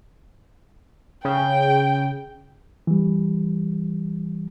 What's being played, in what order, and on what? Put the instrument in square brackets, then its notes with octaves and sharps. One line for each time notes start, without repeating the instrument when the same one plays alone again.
[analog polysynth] C#3 [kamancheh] G5
[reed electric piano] E3 G3